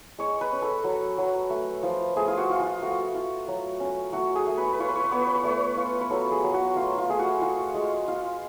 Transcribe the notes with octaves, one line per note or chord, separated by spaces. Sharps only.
G#3 C#5
B4
C#4
A4
F#3
F#3
A3
F3
A3 G#4
F4
F#4
F4
F4
A3 F#4
F4
F#3
C#4
A3 F#4
G#4
A3
B4
C#5
B4
F4 C#5
B4
C#5
B4
B3 C#5
B4
C#5
B4
A3 C#5
B4
F4
B4
F#3 A4
G#4
F#3
F#4
A3 F4
F4
A3 G#4
F#4
F4 F#4
G#3
F4